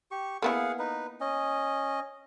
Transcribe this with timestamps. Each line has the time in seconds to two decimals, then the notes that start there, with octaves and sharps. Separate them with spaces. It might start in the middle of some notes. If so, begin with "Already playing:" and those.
0.11 G4 C#6
0.42 A#3 B3 E4 G#4 F5 F#5
0.79 D#4 B4
1.21 C#4 D#5